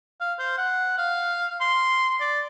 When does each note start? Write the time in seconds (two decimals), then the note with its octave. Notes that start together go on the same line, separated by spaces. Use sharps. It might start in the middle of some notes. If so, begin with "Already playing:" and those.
0.20 F5
0.39 C5
0.57 F#5
0.98 F5
1.61 C6
2.20 D5